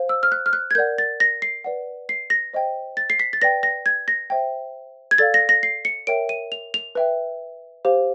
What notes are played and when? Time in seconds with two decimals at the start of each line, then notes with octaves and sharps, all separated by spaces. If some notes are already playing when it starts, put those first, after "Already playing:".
Already playing: C5 F5
0.09 E6
0.23 F6
0.32 F#6
0.46 F6
0.53 F#6
0.71 G#6
0.75 A#4 D5 F#5 G6
0.98 A6
1.20 A#6
1.42 C7
1.64 B4 D5 F#5
2.09 C7
2.30 A#6
2.53 C5 D#5 G5
2.97 A6
3.10 C7
3.20 B6
3.33 A6
3.42 B4 D5 G5 A#6
3.63 A#6
3.86 G#6
4.08 A#6
4.30 C5 E5 G5
5.11 G#6
5.18 A4 D5 F5 A6
5.34 A#6
5.49 A#6
5.63 C7
5.85 C#7
6.07 A#4 C#5 E5 G5 D7
6.29 D#7
6.52 F7
6.74 F7
6.95 B4 E5 G5
7.85 G4 C5 F5